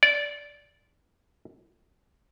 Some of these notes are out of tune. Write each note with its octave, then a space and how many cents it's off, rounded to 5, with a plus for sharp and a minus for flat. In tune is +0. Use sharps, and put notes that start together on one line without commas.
D5 -15